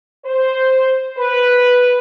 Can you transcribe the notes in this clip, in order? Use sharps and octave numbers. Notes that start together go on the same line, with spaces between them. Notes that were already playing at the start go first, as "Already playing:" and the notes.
C5
B4